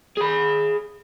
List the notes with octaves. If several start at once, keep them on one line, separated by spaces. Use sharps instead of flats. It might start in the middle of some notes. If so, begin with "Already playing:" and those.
G#4 B5